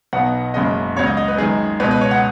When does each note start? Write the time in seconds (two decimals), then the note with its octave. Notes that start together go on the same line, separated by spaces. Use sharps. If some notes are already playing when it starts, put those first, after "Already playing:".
0.13 B1 B2 B3 D#4 F#5
0.54 F#1 F#2 C#3 G#3 D#5
0.96 C#2 C#3 F#3 C#5
1.06 D#5
1.17 D#5
1.28 B4
1.38 F#2 D#3 G#3 G#4
1.80 C#2 B2 G#3 B4
1.91 B4
2.01 C#5
2.11 F#5